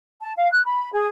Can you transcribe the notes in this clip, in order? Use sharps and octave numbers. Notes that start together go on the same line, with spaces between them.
A5
F5
F#6
B5
G#4